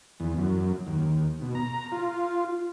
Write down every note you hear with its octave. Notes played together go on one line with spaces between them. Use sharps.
E2
F#2
D#2
B2
A#5
F4